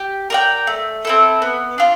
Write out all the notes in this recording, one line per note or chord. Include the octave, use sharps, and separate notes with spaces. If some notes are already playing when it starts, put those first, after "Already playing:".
Already playing: G4
A#4 D5 G5
A3
C4 E4 A4
B3
D4 F4